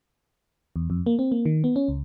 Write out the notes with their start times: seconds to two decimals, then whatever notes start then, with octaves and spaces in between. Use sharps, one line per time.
0.76 E2
0.90 F2
1.06 A#3
1.19 C4
1.32 A#3
1.46 D#3
1.64 B3
1.76 C#4
1.89 C#2